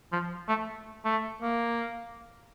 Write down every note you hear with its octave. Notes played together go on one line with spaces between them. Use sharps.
F3
A3
A3
A#3